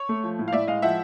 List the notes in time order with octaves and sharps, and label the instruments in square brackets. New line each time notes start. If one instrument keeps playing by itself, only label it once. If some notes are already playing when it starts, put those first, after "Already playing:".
Already playing: [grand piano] C#5
A3
F3
A2
F5
A2 D5 E5
G#3 D#5 F5
F3 E5 F#5